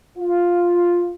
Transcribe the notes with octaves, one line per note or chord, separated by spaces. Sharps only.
F4